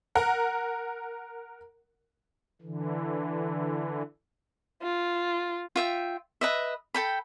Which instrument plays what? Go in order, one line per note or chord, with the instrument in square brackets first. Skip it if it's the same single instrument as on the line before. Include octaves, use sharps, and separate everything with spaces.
[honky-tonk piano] A#4 F#5
[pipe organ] D3 E3
[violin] F4
[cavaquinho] F4 E5 G5
B4 D#5 E5
A4 G5 B5